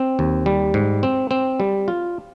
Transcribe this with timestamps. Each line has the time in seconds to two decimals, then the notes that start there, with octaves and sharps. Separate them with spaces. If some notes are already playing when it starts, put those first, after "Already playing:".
Already playing: C4
0.19 D#2
0.46 G3
0.74 G#2
1.03 C4
1.31 C4
1.60 G3
1.88 F4